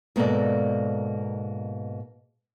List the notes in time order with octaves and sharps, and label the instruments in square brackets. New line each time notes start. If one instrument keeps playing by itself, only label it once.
[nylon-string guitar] G#2 B2 A#3 A4 D5 D#5